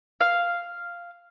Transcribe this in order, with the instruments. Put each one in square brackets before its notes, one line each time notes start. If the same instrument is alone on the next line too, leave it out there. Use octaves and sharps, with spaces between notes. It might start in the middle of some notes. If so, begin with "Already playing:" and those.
[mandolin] F5